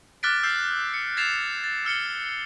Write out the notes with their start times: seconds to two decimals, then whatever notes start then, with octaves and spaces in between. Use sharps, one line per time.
0.23 D6 F6 F#6 A6 B6 D7
0.43 E6 F6 G6 C7
0.94 C#7
1.17 G#6 A6 B6 C7 E7 F7
1.64 A6
1.85 E6 F6 C#7 G7